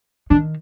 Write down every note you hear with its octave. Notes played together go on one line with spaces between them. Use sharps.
D#3 D4